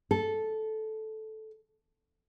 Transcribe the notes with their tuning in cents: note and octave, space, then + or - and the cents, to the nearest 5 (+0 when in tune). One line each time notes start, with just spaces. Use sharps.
A4 -10